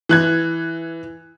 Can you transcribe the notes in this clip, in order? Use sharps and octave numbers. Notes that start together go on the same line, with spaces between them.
E3 F#6 G#6